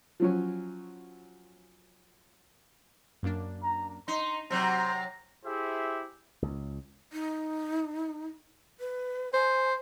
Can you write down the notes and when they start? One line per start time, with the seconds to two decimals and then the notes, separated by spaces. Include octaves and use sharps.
0.20 F3 F#3 C#4
3.23 F#2 A#3 D4
3.63 A#5
4.08 D#4 C6
4.51 C3 F#3 C5 A#5
5.45 E4 G4 G#4 C5 E5
6.42 C#2
7.13 D#4
8.80 B4
9.34 C5 G#5